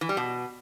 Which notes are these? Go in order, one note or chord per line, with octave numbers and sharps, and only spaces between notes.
E3
G3
B2